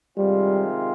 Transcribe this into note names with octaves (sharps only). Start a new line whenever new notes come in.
C3 D#3 G3 G#3 C4 F4